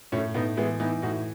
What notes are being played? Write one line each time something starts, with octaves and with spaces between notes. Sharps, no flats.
A2 A3 C#4
A2 B3 D#4
E3 G#3 B3
E3 B3 D#4
A2 D#4 F#4